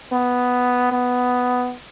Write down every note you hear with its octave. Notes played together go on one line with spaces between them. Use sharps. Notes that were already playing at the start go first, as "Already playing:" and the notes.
B3
B3